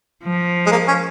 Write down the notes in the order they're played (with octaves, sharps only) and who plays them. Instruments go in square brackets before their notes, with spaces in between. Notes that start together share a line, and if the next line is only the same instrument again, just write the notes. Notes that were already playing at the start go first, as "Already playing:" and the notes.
[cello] F3
[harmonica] G#3
A#3
C#4